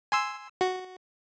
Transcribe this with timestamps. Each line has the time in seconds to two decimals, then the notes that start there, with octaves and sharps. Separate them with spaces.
0.12 G#5 C6 E6
0.61 F#4